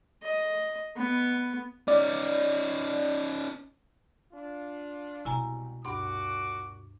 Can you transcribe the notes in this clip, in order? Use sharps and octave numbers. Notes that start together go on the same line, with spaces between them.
D#5
B3
C#4 D#4 D5
D4 F4
C2 B2 G#3 E4 G#5 A#5
D2 G2 A#2 F#4 C6 D6